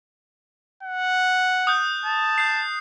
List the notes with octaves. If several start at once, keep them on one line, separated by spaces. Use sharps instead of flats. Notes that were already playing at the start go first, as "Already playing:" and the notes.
F#5
D#6 F#6 G6
A5
G6 C7